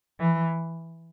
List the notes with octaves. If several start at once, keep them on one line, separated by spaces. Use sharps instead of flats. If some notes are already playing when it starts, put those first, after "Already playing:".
E3